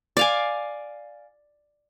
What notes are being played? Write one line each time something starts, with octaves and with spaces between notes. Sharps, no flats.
D5 F5 G#5